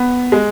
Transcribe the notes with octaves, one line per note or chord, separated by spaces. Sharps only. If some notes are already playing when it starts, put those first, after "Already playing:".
Already playing: B3
G#3